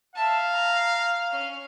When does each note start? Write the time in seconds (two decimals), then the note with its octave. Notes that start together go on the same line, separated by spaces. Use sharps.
0.16 E5 F5 A5
0.53 A#5
1.30 C#4 F6